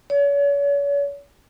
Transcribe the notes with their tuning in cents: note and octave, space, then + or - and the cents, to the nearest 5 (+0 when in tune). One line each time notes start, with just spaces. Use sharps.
C#5 +40